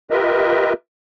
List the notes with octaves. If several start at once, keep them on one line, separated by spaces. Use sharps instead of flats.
F4 G4 A#4 B4 D#5 E5